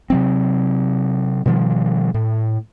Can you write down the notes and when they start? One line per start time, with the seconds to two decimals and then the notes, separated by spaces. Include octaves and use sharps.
0.10 C3 F#3 C4
1.46 B2 D#3 F3 G3
2.14 A2